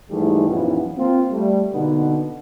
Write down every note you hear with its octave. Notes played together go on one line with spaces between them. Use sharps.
G#2 D#3 E3 G3 A3 G#4
A#1 F#2 D#3 E3 B3 F4
A#3 C4 F4
G3 A3
B2 D3 D#3 A#3 B3 D#4